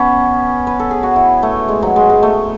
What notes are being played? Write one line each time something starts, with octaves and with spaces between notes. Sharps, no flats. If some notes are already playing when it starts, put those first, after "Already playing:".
Already playing: B3 C#4
B4
A4
G#4
F#4
E4
A3
G#3
F#3
G#3
G#3
A3